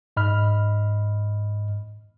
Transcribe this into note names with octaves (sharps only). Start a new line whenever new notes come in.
G#2 D#5 B5 F6